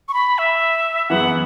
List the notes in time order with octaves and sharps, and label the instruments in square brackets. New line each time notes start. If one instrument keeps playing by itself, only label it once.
[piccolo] C#6
B5
E5
[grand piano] F#2 E3 B3 E4 G#4 [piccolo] F#5